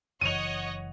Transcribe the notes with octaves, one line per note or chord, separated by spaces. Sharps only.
F#1 E3 C#5 D#5 F#5 D#7 F7